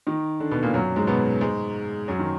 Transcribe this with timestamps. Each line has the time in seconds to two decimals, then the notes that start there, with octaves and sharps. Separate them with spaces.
0.07 D#3 D#4
0.40 D3 D4
0.51 B2 B3
0.63 A#2 A#3
0.74 F#2 F#3
0.96 G#2 G#3
1.07 B2 B3
1.41 G#2 G#3
2.08 F#2 F#3
2.19 D#3